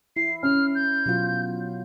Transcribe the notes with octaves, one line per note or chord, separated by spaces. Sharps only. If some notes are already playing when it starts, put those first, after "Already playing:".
E4 C7
C#4 F6
G6
B2 F#3 F4